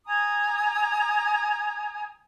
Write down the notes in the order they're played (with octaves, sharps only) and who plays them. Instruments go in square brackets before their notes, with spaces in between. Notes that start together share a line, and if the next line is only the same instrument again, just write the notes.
[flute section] G#5 A#5 D#6